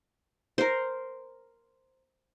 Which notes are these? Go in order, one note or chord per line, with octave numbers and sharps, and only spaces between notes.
A#4 C5